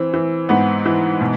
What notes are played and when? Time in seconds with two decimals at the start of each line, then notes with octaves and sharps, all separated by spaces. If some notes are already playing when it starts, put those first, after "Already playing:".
Already playing: E3 C4
0.14 E3
0.49 G#2 B3
0.86 E3
1.21 B2